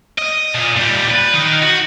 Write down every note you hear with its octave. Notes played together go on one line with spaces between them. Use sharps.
D#5
A#2
A#2 G3
B4
D#3 D#4
F#4